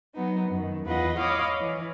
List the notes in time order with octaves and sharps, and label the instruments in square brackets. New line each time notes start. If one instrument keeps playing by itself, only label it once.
[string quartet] F#3 B3 D#4
F#2 D#3
E2 E3 F4 B4 D#5 F#5
C#5 D#5 F5 B5 D6 D#6
E3 C#5